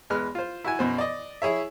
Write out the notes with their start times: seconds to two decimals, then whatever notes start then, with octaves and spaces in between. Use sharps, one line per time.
0.10 E2 G#3 B4 F6
0.35 F4 C5
0.64 E4 F#4 G#5
0.79 F#2 B2 C5
0.98 D5 D#5
1.42 E4 G#4 C#5 E5